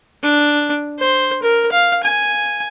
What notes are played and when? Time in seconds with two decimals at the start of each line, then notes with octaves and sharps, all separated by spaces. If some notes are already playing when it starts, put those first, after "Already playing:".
0.23 D4
0.99 C5
1.43 A#4
1.72 F5
2.03 G#5